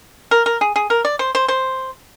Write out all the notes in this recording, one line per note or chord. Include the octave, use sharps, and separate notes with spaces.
A#4
A#4
G#4
G#4
A#4
D5
C5
C5
C5